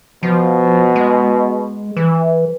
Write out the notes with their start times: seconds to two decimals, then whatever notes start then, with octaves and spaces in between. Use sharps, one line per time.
0.23 B2 F3
0.96 G#3
1.97 E3